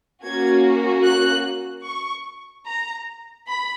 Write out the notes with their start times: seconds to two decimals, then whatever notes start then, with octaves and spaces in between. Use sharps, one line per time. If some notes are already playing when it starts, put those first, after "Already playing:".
0.22 A#3 C#4 F#4 G#6
1.04 F#6
1.85 C#6
2.66 A#5
3.47 B5